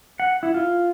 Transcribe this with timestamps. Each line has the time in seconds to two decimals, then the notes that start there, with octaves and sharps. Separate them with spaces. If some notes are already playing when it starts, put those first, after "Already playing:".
0.20 F#5
0.43 E4
0.54 F4